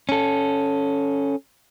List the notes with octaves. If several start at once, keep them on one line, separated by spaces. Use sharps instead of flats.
C#4 A4